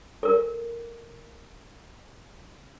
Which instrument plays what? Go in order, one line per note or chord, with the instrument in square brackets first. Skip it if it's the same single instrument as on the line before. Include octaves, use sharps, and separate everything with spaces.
[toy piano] A4 A#4